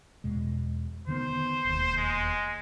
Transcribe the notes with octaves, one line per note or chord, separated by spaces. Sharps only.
E2 B2 G#3
D3 D#3 B3 C5
E1 D#2
G#3